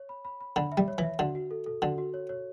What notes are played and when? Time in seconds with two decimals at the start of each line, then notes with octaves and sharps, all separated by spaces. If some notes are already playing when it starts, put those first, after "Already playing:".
Already playing: C#5
0.09 B5
0.25 B5
0.41 B5
0.56 D3 B5
0.72 E5
0.77 G3
0.88 C#5
0.98 E3 E5
1.19 D3 F#4
1.35 F#4
1.51 A4
1.66 A4
1.82 D3 F#4
1.98 F#4
2.14 C#5
2.29 C#5